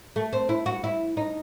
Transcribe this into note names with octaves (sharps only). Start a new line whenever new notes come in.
A3
C4
E4
F#4
E4
D#4